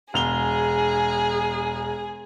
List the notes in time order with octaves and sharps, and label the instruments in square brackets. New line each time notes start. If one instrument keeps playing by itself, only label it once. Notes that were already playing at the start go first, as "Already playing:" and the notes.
[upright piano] E1 F7 G7 [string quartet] G#4